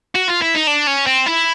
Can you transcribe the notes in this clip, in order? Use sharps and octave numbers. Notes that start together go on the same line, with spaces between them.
F#4
F4
E4
D#4
D4
C#4
C4
E4